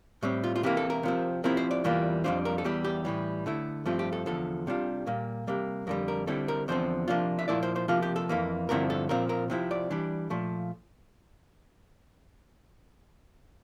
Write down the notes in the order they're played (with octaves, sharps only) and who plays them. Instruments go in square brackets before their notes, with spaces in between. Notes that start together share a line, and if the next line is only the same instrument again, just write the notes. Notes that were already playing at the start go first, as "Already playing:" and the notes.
[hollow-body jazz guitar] A2 G3 C4
F4
F4
C3 E3 A#3 E4 G4
A4
A#4
C3 F3 C4
C3 F3 C4 E4 A#4
C5
D5
E2 E3 G3 A#3 F4
F2 C3 G3 D4 F4 C5
A#4
A4
E2 E3 G3 G4
G4
A2 E3 G3
D3 A3 E4
G2 F3 A3 C4 F4
G4
A4
E2 D3 F3 A4
C3 G3 D4 F4
A#2 G3 A#3
C3 G3 A#3
F2 D3 G3 A#4
A#4
D3 G3 C4 E4 A4
A#4
E2 D3 F3 C4 C5
C3 F3 A#3 D4 F4
E5
A#2 F3 A#3 E4 D5
C5
C5
C3 F3 A#3 F4
G4
A4
F2 E3 A#3
G2 D3 F3 C4 E4 A#4
A4
A#2 F3 C4 A#4
A#4
C3 F3 C4 E4
D5
E3 G3 D4
A#2 F3 A3